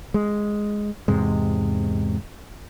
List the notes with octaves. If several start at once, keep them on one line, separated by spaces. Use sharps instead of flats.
G#3
E2 G#2 C3 G#3